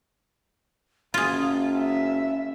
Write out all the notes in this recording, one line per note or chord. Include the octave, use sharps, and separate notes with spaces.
F#1 C#4 F4 G#4
E5